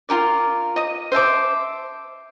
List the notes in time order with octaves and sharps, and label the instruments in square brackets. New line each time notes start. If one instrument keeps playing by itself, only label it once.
[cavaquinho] F4 G4 A#4 D5
D#5 D#6
C5 E5 A5 D6